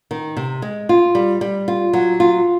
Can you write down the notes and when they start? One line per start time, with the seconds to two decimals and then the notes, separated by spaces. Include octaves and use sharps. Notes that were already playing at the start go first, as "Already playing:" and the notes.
0.11 D#3
0.37 C3
0.62 G#3
0.89 F4
1.15 G3
1.41 G3
1.68 F4
1.93 F#3
2.20 F4